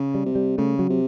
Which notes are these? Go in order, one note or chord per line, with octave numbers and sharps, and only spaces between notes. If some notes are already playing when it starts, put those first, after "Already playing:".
Already playing: C#3
G3
C3
G3
C#3 A3
F#3
C3